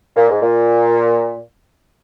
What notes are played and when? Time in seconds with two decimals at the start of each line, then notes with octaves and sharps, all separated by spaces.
0.16 A#2
0.30 G#2
0.42 A#2